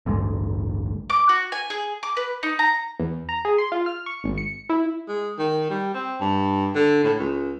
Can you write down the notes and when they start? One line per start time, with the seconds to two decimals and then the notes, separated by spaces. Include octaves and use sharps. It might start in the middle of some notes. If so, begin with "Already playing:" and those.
0.06 A1 D2 G2 G#3
1.10 D6
1.29 F#4
1.52 G#5
1.70 G#4
2.03 D6
2.17 B4
2.43 D#4
2.59 A#5
3.00 E2
3.29 A#5
3.45 G#4
3.58 C6
3.72 F4
3.86 F6
4.06 C#6
4.24 G#1
4.38 C#7
4.69 E4
5.08 G#3
5.39 D#3
5.70 G3
5.95 C4
6.21 G2
6.75 D3
7.04 A2
7.19 C#2